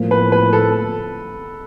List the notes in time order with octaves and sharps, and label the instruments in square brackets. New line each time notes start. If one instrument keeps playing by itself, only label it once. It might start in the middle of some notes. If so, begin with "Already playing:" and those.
Already playing: [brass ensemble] A2 F3 A#3
[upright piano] B4
B4
A4